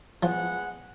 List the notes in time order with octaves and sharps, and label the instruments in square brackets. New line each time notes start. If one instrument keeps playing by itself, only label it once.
[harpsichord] F3 [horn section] G#3 B3 F#5